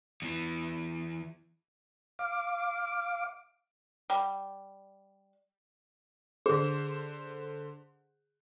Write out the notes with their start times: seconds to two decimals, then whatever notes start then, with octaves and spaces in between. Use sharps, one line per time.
0.22 E2 E3
2.19 F5 D6
4.10 G3
6.46 D3 G#4 C5